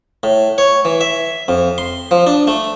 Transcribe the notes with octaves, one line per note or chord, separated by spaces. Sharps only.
A2
C#5
E3
E5
F2
C6
F3
D4
A3